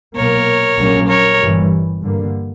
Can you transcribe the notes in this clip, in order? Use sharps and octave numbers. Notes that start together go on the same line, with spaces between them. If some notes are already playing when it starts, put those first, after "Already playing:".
B1 A#2 A#3 A#4 C#5
A#1 A#2 F#3 A#3 C#4
A#4 C#5
G1 G2 E3 G3
G2 D3 A#3